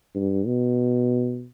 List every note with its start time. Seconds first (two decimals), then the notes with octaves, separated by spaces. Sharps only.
0.15 G2
0.47 B2